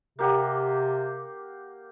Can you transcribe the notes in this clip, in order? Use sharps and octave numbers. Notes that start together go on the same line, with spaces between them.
C3 A#3 G4 F#5